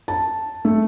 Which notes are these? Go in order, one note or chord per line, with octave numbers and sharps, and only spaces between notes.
A5
A3